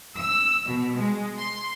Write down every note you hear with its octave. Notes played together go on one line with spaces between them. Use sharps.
E6
B2
G#3
C6